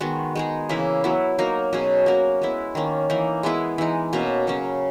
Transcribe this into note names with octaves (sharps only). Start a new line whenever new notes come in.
D#3 G#3 B3 F#4
G#3 D#4 G#4
C#3 E3 A#3 E4
F#3 B3 E4
F#3 A#3 D#4 A#4
B2 F#3 C#4 G#4
A#3 C#4 F#4 A#4
G#3 B3 E4
D#3 A#3 C#4
E3 A#3 D#4
G#3 B3 E4 G#4
E3 G#3 D#4
B2 A#3 C#4
C#3 F#3 C#4